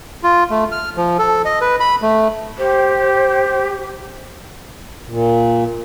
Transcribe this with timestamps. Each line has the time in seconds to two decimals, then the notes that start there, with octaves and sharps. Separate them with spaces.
0.23 F4
0.50 A3
0.72 F6
0.97 F3
1.19 A4
1.45 D#5
1.61 B4
1.80 B5
2.02 A3
2.58 G4 C5
5.08 A#2